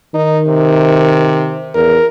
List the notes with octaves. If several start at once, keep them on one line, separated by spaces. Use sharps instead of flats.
D#3 D#4
C3
E2 A#4